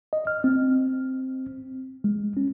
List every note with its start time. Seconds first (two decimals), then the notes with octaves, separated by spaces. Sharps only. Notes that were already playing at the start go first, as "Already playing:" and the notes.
0.13 D#5
0.27 F6
0.44 C4
2.04 G#3
2.37 C#4